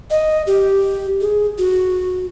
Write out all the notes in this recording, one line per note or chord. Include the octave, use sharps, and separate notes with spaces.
D#5
G4
G#4
F#4